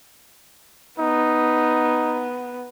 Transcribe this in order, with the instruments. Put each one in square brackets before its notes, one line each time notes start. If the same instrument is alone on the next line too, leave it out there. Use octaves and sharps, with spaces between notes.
[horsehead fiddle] B3 [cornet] D#4